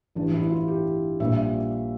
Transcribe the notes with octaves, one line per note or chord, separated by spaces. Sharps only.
A1 G2 E3 D4
E4
F4
G4
A#1 A#2 G3 E5